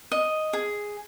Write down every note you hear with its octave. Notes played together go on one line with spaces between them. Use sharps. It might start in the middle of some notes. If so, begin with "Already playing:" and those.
D#5
G#4